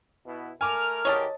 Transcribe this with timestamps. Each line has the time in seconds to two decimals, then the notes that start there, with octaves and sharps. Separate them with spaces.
0.25 B2 B3 E4
0.61 A3 A#4 G#5 D6 F6
1.05 E2 G4 A#4 C#5 D#5 A5